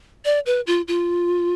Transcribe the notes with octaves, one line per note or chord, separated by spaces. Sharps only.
D5
B4
F4
F4